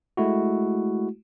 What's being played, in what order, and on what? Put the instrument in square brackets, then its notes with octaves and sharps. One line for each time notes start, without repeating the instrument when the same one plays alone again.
[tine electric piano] G#3 A3 E4 F#4